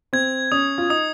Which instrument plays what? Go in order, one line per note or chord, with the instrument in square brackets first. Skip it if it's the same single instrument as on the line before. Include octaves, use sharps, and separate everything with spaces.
[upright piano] C4 [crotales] G#6
[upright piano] C#4 [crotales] D#6
[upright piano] F4
[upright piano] D#4 [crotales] D#6